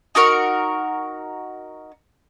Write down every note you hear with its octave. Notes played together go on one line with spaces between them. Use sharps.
D#4 F#4 A#4 C#6